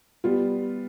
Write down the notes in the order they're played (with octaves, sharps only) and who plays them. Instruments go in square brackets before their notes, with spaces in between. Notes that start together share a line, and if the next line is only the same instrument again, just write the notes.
[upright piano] G3 B3 F4